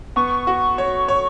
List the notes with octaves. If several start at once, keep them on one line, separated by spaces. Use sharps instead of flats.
B3 C#6
F#4
C#5
C#5